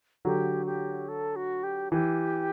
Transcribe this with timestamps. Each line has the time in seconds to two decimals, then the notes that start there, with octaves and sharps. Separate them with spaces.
0.25 D3 F#3 G4
0.66 G4
1.08 A4
1.36 F#4
1.63 G4
1.92 E3 G4